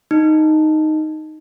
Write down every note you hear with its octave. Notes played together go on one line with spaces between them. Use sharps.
D#4